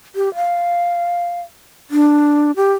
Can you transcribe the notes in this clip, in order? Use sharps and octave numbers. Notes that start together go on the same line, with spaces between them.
G4
F5
D4
G4